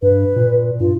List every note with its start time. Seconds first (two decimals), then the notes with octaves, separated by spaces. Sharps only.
0.02 G2 B4
0.36 A#2
0.80 G2 F4